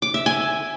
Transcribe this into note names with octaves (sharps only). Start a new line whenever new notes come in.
D6
E5
G#5